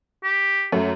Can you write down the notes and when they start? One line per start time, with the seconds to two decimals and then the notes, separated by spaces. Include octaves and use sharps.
0.24 G4
0.72 F#2 A3